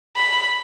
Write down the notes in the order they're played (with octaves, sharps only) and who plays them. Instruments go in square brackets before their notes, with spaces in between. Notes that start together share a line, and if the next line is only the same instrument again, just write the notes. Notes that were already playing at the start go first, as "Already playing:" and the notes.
[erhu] B5